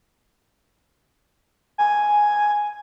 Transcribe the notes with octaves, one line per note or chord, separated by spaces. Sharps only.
G#5